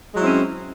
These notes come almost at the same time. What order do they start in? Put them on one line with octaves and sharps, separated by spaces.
G#3 F#3 E4 C4 C#4